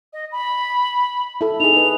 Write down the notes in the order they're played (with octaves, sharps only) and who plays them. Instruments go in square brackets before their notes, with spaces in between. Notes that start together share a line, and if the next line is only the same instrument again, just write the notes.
[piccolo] D#5
B5
[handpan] E4 A4
[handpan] D#4 G#4 [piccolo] F7
[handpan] D#4 B4